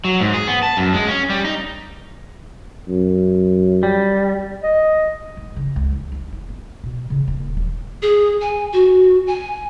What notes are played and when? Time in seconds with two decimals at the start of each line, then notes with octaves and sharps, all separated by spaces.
0.05 F#3
0.21 G#2
0.34 G#4
0.48 B3
0.63 A5
0.77 F#2
0.94 G#3
1.07 C#4
1.30 G3
1.45 D#4
2.88 F#2
3.83 G3
4.63 D#5
5.37 G#2
5.56 C#3
5.76 C#2
5.92 F4
6.12 D4
6.33 E4
6.49 B3
6.84 B2
7.10 C#3
7.28 D#1
7.57 F#3
8.02 G#4
8.41 G#5
8.73 F#4
9.27 G#5